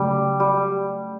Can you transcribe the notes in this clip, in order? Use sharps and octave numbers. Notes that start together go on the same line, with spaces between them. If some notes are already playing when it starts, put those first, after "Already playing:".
Already playing: C#3 F#3 G3 A3
G3